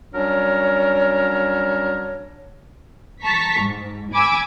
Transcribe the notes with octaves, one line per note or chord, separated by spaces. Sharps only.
F#3 G3 C#4 D4 A#4 C#5
A5 A#5 C#6 B6
G#2
G#5 B5 D6 E6